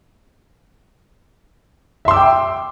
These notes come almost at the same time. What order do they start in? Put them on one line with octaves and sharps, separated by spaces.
E5 C6 E6 D6 G5